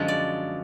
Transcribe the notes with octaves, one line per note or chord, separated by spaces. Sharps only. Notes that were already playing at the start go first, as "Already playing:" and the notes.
Already playing: F#2 D3 F3 G#3
D5